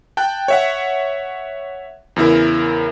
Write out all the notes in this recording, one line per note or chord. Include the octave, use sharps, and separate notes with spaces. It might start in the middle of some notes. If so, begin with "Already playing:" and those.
G5 A5 F#6
C#5 E5 F#5
E2 C#3 E4 A#4